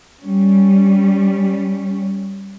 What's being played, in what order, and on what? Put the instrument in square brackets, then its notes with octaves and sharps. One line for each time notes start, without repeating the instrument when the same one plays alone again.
[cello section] G3 C#4